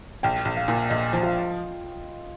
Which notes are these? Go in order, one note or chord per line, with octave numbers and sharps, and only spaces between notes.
A#1 G5
A#1
F5
A#2
A#1 D#5
F3
F4